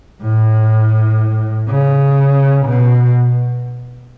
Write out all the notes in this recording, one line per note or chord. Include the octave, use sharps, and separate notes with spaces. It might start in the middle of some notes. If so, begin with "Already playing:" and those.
A2
C#3
B2